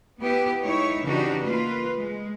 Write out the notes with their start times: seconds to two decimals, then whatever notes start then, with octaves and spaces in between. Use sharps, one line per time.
0.20 B3 E4 G4 B4
0.64 G#3 D#4 E4 C#5
1.02 C#3 E3 D4 D#4 F#4 G4
1.42 A#3 F4 B4
1.97 G#3